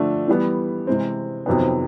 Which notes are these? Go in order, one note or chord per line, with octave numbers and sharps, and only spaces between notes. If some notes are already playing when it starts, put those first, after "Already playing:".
Already playing: D3 F3 A3 D4
E3 G3 B3
C3 E3 G#3 C4
F2 C3 D#3 F#3 B3